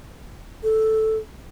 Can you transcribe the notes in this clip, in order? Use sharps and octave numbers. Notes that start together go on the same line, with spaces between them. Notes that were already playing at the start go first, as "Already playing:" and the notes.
A4